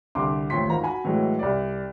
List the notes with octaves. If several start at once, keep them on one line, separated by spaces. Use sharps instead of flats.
C2 D3 C6 D6
A1 D#2 F3 C6 B6
G#1 F4 A#5
F#4 G#5 B5
A2 E3 F#3 G#3
C2 D5